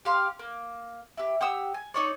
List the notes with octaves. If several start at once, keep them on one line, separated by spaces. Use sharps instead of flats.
G4 F5 C6
A#3
E4 G4
G4 F#5 D#6 E6
G#5
D#4 C#5 D5